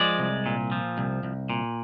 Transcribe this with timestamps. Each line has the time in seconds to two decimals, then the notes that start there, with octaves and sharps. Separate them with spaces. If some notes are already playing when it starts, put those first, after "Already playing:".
Already playing: F3 G#3 D5
0.19 C2
0.46 A#2
0.72 F3
0.98 C2
1.23 C2
1.49 A#2